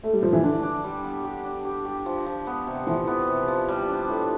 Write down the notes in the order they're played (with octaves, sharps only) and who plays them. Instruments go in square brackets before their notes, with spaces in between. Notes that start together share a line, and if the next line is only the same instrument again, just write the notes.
[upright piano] A3
G3
F3
E3
[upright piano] D3 [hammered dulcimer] D4
[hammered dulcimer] D4
G3
B3
G4
D4
G4
G4
F3
F3
B3
C3
[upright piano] E3 [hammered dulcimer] F3
[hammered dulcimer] B3
C3
F3
G3
D4
A2